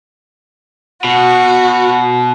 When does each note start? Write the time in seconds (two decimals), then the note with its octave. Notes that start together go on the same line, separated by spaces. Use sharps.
1.04 B2 F#4